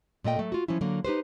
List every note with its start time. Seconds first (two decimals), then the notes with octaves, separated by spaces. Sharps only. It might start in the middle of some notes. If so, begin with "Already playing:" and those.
0.24 A#2 A3 D#5 G5
0.39 F#3 A3
0.52 F4 F#4
0.68 F3 F#3 C#4 E4
0.81 D3 F#3 A#3
1.05 D#4 G4 B4 C5